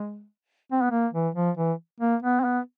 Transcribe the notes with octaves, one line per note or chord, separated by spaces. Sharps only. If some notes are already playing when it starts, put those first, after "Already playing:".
Already playing: G#3
C4
B3
A#3
E3
F3
E3
A#3
B3
C4
B3